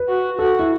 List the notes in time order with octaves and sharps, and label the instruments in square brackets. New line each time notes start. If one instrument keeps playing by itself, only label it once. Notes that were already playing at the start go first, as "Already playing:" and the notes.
Already playing: [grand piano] B4
[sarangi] F#4
[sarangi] F#4 [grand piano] A4
[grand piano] E4